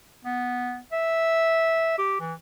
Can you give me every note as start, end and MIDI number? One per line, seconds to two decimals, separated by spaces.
0.25 0.78 59
0.93 1.94 76
1.98 2.17 67
2.20 2.33 52